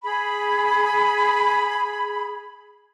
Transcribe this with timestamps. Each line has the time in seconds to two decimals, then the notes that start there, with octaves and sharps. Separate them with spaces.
0.03 G#4 B5